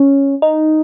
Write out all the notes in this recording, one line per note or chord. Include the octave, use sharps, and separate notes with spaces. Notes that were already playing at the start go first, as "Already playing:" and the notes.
Already playing: C#4
D#4